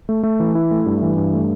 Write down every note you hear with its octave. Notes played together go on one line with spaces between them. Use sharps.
A3
A3
E3
E4
A3
G2
E3
G2
A3